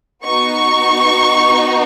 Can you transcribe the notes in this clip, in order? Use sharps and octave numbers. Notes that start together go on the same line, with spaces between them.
B3 D#4 F#4 C#6